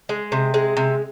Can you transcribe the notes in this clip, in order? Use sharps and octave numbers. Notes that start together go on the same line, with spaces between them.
G#3
C3
G#3
C3